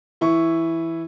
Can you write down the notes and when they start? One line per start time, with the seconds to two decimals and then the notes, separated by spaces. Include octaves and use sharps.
0.21 E3 E4 C#6